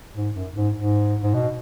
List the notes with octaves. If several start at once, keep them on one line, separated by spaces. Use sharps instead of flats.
G#2
F#2
G#2
G#2
G#2
B2